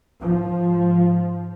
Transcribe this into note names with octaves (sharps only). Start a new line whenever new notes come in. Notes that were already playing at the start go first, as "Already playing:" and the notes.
G#2 F3